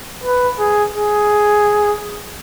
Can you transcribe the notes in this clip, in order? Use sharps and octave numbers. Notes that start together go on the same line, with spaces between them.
B4
G#4
G#4